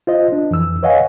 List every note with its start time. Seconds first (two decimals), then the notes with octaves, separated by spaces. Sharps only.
0.07 F4 C5 D#5
0.32 D4
0.51 F2 E3 E6
0.83 B4 C#5 D#5 F5 F#5 G#5